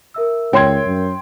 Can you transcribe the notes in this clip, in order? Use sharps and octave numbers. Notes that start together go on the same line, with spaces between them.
A#4 E5 E6
C#2 C#5 G5 C6 G#6
F#2